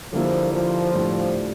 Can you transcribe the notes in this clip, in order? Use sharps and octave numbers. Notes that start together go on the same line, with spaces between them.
D3 F3 G3 A#3 E4
F3
A2 G3 D4 F4